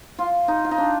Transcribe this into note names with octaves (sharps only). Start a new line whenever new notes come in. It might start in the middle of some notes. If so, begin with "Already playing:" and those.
F4
D#4
F4
D#4
D4